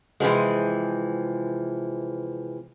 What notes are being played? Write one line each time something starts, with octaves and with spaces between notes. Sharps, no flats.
C3 E3 F3 G#3